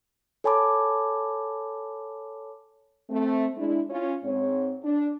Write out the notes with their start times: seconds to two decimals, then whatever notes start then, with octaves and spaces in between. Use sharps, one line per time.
0.44 A4 C#5 G#5 A5 B5 D6
3.09 A3 C4
3.56 G#3 D4 E4
3.89 C#4 F4
4.23 G#2 C4 C#5
4.83 D4